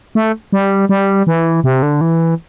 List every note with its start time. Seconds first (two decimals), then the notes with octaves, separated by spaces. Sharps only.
0.15 A3
0.53 G3
0.89 G3
1.27 E3
1.64 C3
1.83 D3
2.01 E3